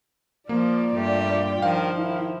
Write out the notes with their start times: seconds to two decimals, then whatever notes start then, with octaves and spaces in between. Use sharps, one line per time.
0.49 F3 A#3 F4 D5
0.95 G2 A3 G4
1.62 D#3 F3 F5
1.94 D#3 E4